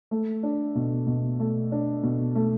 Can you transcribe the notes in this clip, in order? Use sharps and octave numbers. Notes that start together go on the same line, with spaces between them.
A3
D4
B2
B2
A3
D4
B2
A3